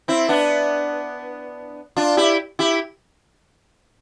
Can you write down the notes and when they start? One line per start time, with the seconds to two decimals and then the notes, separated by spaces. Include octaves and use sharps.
0.08 C4 E4
0.29 B3 D4
1.96 D4 F4
2.17 E4 G4
2.59 E4 G4